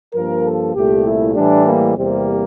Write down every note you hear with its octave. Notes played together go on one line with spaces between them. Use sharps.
G2 F3 A#3 A#4
A4
C2 A#2 A3 G4
E4
A2 E3 G3 D4
A#3
E2 C3 G3 A#3 C4